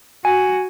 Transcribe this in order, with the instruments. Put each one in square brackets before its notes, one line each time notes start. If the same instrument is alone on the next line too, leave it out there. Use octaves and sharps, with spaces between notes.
[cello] F#4 [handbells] G#5